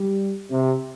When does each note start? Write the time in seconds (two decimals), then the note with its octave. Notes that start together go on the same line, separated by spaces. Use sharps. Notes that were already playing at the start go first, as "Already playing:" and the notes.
Already playing: G3
0.50 C3